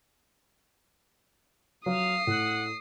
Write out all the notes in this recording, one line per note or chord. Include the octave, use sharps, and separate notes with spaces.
F#3 F5 D#6 C7
A2 F#5